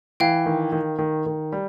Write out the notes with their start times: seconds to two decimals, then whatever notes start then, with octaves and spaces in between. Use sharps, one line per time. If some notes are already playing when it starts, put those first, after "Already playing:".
0.20 E3 F5 G5
0.46 D#3
0.72 D#3
0.99 D#3
1.26 D#3
1.52 G3